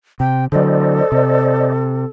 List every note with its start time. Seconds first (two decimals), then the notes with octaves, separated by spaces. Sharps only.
0.20 C3 G5
0.52 D3 F#3 A4 C5 D5 D#5
1.12 C3